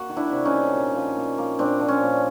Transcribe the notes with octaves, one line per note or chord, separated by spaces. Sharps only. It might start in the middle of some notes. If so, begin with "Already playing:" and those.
Already playing: A#3 F#4
D#3
D4 E4
C3
C#4 D#4
G3
A#2
F3
A#2
A#3
A#2 C4 D4
F3
C#4
A#2